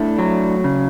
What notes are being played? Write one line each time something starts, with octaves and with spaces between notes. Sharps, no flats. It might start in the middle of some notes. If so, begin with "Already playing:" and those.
Already playing: A3 D4 E4
F#3
C#3